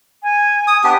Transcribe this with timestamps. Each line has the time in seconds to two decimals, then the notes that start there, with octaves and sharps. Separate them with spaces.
0.23 G#5
0.67 D#6
0.84 B3 D4 G4